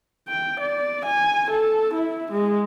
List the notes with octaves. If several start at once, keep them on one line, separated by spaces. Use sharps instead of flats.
G5
D5
G#5
A4
E4
G#3